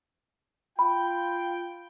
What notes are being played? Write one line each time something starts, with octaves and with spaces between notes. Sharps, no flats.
F4 G5 B5